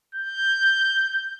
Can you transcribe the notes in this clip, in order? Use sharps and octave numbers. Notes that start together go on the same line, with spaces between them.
G6